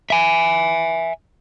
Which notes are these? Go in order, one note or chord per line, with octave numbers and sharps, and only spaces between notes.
E5 G#5